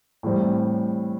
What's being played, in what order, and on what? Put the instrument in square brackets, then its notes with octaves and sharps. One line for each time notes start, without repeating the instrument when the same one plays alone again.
[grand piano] A2 E3 G3 C4